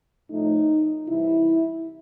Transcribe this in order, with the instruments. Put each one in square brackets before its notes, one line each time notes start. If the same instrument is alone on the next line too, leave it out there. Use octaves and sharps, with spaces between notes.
[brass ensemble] A2 F3 A3 D#4
C3 E3 G3 E4